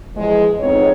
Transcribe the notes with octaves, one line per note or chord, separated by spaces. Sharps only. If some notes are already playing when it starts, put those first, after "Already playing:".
E2 F3 G#3
F2 G#2 B3 C4 D#4 C#5